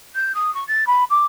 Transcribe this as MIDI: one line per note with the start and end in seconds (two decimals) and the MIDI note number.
0.15 0.34 91
0.34 0.52 87
0.54 0.63 85
0.67 0.86 93
0.86 1.04 83
1.10 1.26 86